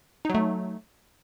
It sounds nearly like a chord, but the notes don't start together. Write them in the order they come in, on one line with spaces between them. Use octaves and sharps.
D#4 F#3 A3